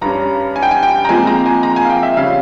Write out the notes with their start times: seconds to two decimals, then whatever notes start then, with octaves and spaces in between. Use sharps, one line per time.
0.01 G2 G3 C#4 A#5
0.56 G#5
0.63 G5
0.71 G#5
0.83 G5
1.05 A#5
1.09 A#2 F3 G#3 C4 G#5
1.27 A#5
1.46 G#5
1.63 A#5
1.76 G#5
1.85 F5
1.90 G5
2.03 E5
2.17 C#3 G3 C#4 F5